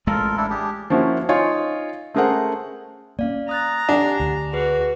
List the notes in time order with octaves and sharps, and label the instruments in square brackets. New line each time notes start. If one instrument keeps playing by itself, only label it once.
[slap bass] A1 G#3 A3 [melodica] F4 A4 A#4
[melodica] D4 E4 A4
D4 G4 G#4
[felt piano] F3 A#3 C#4 E4 F#4
D#4 F4 C#5 G#5
A3 C#4 G#4 A#4 C5 F#5
[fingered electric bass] A#3 C#4 [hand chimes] D5 F5
[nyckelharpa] A#5 [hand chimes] D#6 F#6 A6
[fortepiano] D4 [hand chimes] G4 F#5 G#5
[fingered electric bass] D2
[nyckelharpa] F#4 [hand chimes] G#4 B4